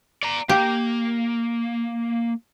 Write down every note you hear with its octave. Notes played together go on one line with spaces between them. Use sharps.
D5 A#5
A#3 G4